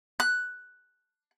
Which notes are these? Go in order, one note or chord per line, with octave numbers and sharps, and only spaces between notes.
F#6